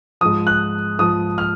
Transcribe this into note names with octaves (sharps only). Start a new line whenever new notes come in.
G#2 F3 D#6
F#6
G#2 F3 D#6
F6